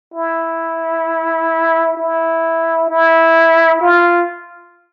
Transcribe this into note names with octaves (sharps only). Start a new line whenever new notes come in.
E4
E4
E4
F4